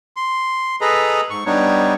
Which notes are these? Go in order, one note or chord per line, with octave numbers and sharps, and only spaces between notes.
C6
G#4 A4 B4 D#5 A#5 B5
G#2 C#6
G3 B3 D4 D#4 C#5